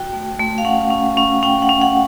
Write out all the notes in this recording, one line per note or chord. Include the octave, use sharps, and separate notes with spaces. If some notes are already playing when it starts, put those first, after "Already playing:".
Already playing: F#4 G5
A3
A3
F5
C#4 F#5
C#4
C#4
C#4 G5
F#5
C#4
F#5